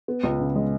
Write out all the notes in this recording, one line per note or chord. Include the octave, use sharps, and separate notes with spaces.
B3
C#2
C#3
G#3